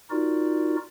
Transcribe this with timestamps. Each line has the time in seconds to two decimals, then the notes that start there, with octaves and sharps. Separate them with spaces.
0.10 D#4 F4 F#4 A#4 D5